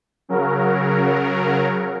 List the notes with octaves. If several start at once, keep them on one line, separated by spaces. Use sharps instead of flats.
C#3 F#3 A#4